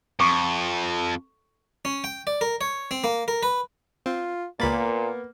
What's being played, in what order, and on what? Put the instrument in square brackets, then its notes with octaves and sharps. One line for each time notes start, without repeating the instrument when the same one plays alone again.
[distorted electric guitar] F2 [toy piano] A4 C#6
[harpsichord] C#4
G5
D5
A#4
C#5
C4
A#3
A#4
B4
[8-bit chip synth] C4 [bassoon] F4
[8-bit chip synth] C#2 B5 A6 [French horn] A#2 [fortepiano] A#3 [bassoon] B3